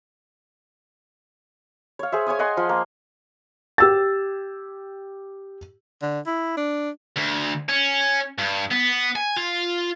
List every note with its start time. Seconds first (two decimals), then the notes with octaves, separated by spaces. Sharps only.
1.99 C#5 F5
2.12 G#4 C5 E5
2.27 C#5 G#5 C#6 D#6
2.39 D#5 F#5 G#5 C6
2.57 F3 F4
2.69 A#3
3.78 G4 E6 A6
6.02 D3
6.26 E4
6.57 D4
7.17 D2
7.69 C#4
8.38 G2
8.71 B3
9.16 G#5
9.37 F4